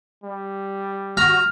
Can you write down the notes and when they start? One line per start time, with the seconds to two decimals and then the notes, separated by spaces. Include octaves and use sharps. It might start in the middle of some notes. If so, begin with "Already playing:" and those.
0.24 G3
1.17 F#4 A#5 F6